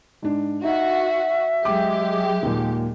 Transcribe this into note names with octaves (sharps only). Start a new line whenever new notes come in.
G#2 D4
D#4 F#4 E5
F#3 G#3 G4 D6
D#2 A#2